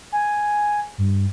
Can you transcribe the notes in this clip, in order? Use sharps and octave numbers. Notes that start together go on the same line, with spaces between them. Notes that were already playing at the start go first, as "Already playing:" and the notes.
G#5
G2